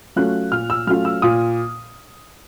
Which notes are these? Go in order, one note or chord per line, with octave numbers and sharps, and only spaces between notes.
F#3 A3 C#4 F4 F#6
A#2 F6
E6
F#3 A3 C#4 F4 F6
E6
A#2 D#6